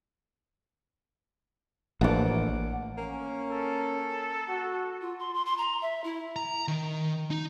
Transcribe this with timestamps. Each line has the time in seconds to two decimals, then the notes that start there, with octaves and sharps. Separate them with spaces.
2.01 A1 F3 A#3 D4 F#5 D6
2.98 A#3 C#4
3.50 A4
4.48 F#4
5.01 F4
5.19 C6
5.34 C6
5.45 C6
5.57 A#5
5.81 E5
6.04 E4
6.36 A#5
6.68 D#3
7.31 D#4